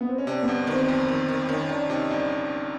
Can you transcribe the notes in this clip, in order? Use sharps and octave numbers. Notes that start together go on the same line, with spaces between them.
B3
C4
C#4
C3 D4
B3
G1
D#3
C4
F2
D#3
D#3
D#3 C#4
D#3 D4
C3 D#4
G1 D4